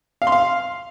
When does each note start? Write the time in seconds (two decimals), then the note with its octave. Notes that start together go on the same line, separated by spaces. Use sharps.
0.22 F5
0.27 C6
0.32 F5